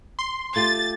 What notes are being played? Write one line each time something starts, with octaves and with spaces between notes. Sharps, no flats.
C6
A3 F4 G4 A6